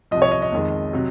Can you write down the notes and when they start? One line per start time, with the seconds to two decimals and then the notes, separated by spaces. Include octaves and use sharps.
0.11 C2 C3 F3 D#5
0.22 C#5
0.32 D#5
0.42 D#5
0.52 F2 D#3 G#3
0.93 C3 F#3